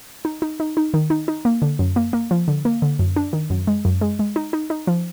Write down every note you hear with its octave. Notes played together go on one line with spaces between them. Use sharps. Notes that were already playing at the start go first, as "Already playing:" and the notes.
D#4
D#4
D#4
D#4
D#3
D#4
D#4
A#3
D3
F#2
A#3
A#3
F3
D3
A#3
D3
F#2
D4
D#3
F#2
G#3
F#2
G#3
G#3
D#4
D#4
D#4
F3